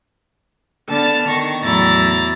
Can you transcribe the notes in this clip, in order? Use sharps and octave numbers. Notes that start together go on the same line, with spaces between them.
D3 B3 A5 F6 A6
D#3 C#6 A#6
E2 A2 F#3 E4 A#5 A6